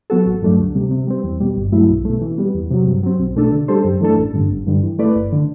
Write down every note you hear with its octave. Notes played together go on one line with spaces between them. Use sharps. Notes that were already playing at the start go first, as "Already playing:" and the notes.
F#3 B3 F#4 A4
A1
G2 F#3 A3 D4
D2
C3 G3
C3
G3 C4
E2
B2 G3
G1
G2 F#3 A3 E4
B1
B2 A3
E3
G3 B3
E2
C3 F#3
G2
F#3 C4
B1
B2 A3 D4 A4
D3
G3 D4 A4 C5
F#2
E3 A3 D4 A4
A1
G2 D3
G1
G2 D3 G3
E3
A3 E4 B4 D5
G1
D3